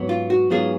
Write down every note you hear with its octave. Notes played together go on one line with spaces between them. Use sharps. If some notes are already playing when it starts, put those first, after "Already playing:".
Already playing: G#2 F#3 B3
F4
F#4
G#2 F#3 B3 F4 G#4